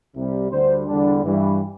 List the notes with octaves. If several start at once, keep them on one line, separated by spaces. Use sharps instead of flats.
C2 C3 G3
D2 D3 G3 C5
E2 D3 G3 D4
G2 E3 G3